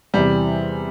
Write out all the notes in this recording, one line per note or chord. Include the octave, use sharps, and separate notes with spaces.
E2 C3 E3 G3